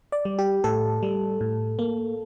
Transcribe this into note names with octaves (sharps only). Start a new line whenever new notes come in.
D5
G3
G4
A2 A4
G3
A2
A#3